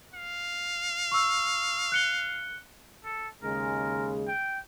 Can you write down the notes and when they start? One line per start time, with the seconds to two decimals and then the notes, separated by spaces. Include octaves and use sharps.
0.14 F5
1.12 C#6 E6
1.92 F#6 C#7 G7
3.04 A4
3.42 D#2 C#3 G#3 A#4
4.28 G5